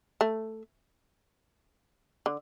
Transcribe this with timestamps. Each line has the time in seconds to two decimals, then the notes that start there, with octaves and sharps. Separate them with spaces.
0.21 A3
2.26 D3